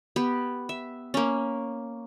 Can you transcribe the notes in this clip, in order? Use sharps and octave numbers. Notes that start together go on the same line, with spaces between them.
B3 G4
E5
A#3 C#4